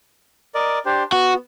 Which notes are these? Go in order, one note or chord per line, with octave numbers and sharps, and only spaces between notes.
A#4 D5 D#5
D4 G4 C5
B3 F#4